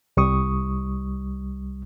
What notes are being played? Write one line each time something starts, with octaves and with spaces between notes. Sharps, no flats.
C2 G3 C#6 D#6